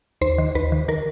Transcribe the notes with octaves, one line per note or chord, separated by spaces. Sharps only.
D#2 C5
D#3
D#2 B4
D#3
D#3 A#4